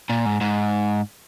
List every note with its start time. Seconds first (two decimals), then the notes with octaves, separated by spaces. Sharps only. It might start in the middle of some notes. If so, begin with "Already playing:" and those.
0.10 A#2
0.25 G#2
0.41 G#2